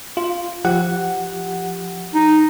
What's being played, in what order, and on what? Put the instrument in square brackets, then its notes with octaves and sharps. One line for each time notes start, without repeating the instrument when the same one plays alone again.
[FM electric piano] F4
F3 G4 F#5
[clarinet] D#4